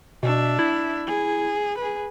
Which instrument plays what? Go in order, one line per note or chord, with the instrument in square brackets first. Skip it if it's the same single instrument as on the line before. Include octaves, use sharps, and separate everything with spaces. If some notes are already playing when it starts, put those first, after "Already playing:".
[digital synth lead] B2 [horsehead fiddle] D4 E5
[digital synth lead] E4
[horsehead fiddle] G#4
G#4 B4